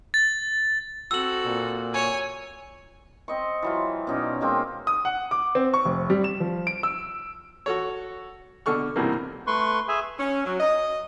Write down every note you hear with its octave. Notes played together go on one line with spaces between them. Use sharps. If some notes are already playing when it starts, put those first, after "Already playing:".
A6
C4 F#4 A4 E6 F#7
A#2
C#5 G#5
C4 D#5 C#6
E3 F#3 F4
B2 C#4 D#4 D5
G#3 A#3 C4 G5
D#6
F#5
D6
C4
C#6
F1
G3
E7
F3
D7
E6
F#4 A4 C#5
B2 D3 A4 C#6 F6
B1 G2 C3 E3 A#3
A3 B4 C6 C#6
G#4 E5 G#5
C#4
F#3
D#5